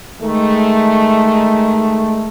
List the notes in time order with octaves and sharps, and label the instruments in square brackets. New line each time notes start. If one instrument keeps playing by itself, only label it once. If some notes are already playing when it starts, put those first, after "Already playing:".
[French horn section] D#3 G#3 A3